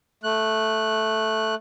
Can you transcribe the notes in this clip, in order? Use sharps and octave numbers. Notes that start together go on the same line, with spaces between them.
A3 F#6